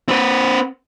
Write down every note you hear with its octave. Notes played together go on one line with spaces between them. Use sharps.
C4 B4